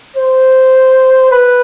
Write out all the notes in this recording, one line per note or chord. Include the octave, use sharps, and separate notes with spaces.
C5
B4